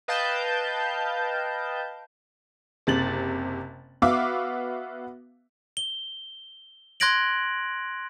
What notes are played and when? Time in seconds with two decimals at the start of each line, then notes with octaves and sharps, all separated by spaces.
0.08 B4 D#5 F5 G5 A5 G6
2.87 F#1 C3 A6 F#7
4.02 B3 F#4 E5 F5 D6
5.77 G7
7.00 C6 F#6 G#6 A#6 D7 F#7